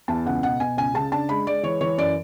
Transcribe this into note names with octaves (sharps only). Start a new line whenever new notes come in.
E2 A5
C#2 F#5
B2 F#5
B2 G#5
C#2 G#5
C#3 A5
D4 A5
G#3 B5
G#3 D5
E3 C#5
E3 C#5
F#2 D5